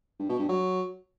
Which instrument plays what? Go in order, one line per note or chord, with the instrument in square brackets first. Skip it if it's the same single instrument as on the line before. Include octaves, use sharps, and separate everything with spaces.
[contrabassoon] G2
B2
G2
F#3